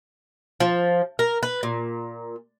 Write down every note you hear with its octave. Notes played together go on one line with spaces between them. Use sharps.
F3
A#4
B4
A#2